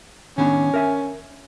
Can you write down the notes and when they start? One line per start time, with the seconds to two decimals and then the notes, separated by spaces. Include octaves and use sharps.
0.38 D#3 B3 C#4 D4
0.74 A#4 E5 G#5